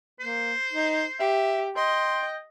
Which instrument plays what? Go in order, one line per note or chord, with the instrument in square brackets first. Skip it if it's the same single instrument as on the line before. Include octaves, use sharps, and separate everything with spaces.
[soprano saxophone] A#3 [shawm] C5
[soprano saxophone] D#4
[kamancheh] G4 [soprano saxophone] E5
[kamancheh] D#5 [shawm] G5 [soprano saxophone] C6